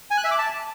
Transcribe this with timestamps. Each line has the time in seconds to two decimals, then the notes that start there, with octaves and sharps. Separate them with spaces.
0.11 G#5
0.17 F#6
0.24 E5
0.31 D6
0.38 A5